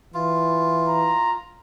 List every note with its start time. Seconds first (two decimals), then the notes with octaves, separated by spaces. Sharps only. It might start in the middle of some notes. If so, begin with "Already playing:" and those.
0.14 E3 F4
0.88 A#5